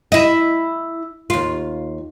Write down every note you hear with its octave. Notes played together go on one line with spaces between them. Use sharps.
E4 D#5
D#2 F4